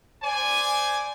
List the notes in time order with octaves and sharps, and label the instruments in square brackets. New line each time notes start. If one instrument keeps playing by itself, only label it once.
[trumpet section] C5 D5 G#5